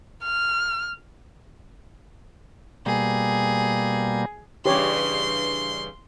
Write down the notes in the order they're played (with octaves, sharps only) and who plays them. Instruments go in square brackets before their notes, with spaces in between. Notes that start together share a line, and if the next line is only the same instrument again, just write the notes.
[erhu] F6
[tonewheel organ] B2 G3 A#3 [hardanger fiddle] G#4
[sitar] G2 C#3 E3 [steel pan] G4 C#5 [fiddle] C6